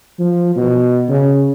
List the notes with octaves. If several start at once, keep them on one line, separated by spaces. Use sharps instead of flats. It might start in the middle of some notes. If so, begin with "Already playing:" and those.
F3
B2
C#3